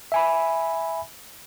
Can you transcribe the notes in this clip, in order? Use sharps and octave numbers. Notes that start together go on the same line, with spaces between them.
E5 G#5 B5